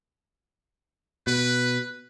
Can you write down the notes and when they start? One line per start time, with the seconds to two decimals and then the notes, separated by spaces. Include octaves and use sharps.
1.27 B2 B4